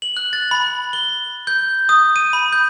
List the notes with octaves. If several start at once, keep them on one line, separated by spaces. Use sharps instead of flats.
F#7
F#6
A6
B5
G7
G6
D#6
D#7
B5
G6